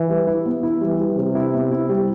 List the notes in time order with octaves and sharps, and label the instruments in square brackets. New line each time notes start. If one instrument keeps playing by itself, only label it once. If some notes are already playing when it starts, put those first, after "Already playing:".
Already playing: [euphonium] E3
[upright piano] G3
E4
B3
E4
[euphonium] E3 [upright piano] G3
[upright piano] G3
[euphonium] C3 [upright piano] G3
[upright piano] E4
B3
E4
G3